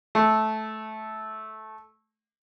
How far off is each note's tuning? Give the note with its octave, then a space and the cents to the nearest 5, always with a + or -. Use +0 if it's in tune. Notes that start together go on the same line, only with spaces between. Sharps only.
A3 -15